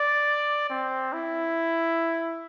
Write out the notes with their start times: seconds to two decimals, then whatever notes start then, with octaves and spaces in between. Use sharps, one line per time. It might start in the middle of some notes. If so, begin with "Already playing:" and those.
Already playing: D5
0.70 C4
1.13 E4